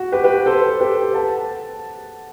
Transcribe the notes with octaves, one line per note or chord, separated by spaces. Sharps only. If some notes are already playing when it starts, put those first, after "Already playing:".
Already playing: F#4
G4 B4
G4 B4
A4 C5
G4 B4
F#5 A5